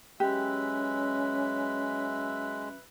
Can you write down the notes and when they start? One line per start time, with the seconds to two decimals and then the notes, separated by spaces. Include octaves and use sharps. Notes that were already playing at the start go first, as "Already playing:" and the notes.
0.20 F#3 G#3 C#4 G4 B4 E5